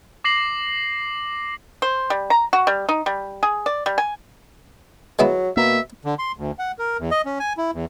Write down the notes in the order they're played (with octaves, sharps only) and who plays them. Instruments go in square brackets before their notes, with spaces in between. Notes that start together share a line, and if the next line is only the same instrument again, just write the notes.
[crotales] D6 A#6 C7 F#7
[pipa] C5
G3
A#5
F#4
G3
D#4
G3
G#4
D5
G3
G#5
[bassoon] F#3 [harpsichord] G#3 B3 E4
[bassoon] B2 [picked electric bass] A#3 [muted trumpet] E5
[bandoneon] D3
C6
D2
F#5
A#4
E2
D#5
C#4
G#5
E4
E2